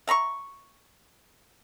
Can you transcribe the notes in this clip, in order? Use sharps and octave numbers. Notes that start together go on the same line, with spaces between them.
E5 A#5 B5 C#6